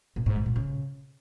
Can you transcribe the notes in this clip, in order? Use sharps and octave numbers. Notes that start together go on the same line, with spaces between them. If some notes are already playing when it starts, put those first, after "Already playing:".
A#2
G#2
D3
A#2
C#3